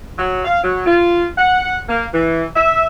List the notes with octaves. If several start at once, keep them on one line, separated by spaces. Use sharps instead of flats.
F#3
F5
F#3
F4
F#5
A#3
E3
E5